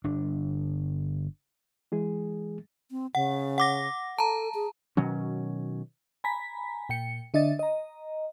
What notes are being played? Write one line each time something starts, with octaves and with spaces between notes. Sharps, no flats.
G1 D4
E3 G#3 G#4
C4
C#3 F#5
F#5 D6 A#6
A4 A5 A#5
G#4
B2 D#3 F#3 C#4
G#5 A#5 B5 B6
A#2 G5 C#7
D3 D4 D#5 E5 A6
D#5 A#5